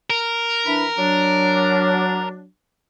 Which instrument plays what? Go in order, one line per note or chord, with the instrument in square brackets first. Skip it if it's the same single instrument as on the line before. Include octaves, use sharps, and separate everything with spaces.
[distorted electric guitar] A#4
[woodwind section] E3 D4 B5
F#3 D4